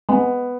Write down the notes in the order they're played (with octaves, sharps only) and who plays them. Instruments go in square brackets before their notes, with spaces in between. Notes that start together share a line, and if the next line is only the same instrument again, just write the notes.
[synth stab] G#3 [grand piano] B3